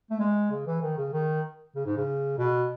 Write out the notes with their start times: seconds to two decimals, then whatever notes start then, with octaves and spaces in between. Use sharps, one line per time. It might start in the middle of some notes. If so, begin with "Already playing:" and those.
0.11 A3
0.20 G#3
0.51 C#3
0.67 E3
0.82 D#3
0.98 C#3
1.13 D#3
1.76 C#3
1.86 G#2
1.97 C#3
2.38 B2